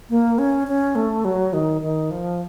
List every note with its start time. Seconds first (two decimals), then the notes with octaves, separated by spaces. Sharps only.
0.10 A#3
0.39 C#4
0.68 C#4
0.95 A3
1.25 F#3
1.53 D#3
1.82 D#3
2.11 F3